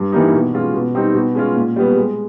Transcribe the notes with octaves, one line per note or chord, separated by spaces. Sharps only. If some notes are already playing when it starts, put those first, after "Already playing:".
Already playing: G2
E3 G3 A#3 D#4
B2
G#3 C#4 F4 G#4
B2
G3 C4 D#4
B2
G#3 C#4 F4
A#2
G3 B3
G#3